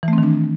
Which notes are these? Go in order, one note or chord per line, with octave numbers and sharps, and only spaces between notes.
E3
A3
C4
D#3
D4